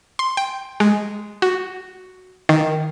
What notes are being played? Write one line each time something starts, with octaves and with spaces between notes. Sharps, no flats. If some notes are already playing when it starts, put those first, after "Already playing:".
C6
G5
G#3
F#4
D#3